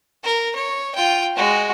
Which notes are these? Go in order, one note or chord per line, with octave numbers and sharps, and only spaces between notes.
A#4
C#5
F4 G5
G#3 F#4